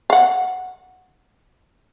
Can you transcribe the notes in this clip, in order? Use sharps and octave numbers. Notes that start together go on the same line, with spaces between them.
F5 F#5